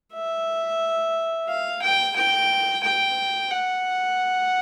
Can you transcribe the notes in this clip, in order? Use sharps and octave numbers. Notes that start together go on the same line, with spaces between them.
E5
F5
G5
G5
G5
F#5